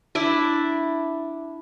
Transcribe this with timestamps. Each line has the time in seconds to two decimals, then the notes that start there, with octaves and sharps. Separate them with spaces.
0.15 D4 E4 D5 E5